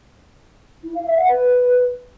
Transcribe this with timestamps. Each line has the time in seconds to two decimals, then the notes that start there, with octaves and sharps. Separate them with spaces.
0.83 E4
0.94 F5
1.06 E5
1.17 F#5
1.28 B4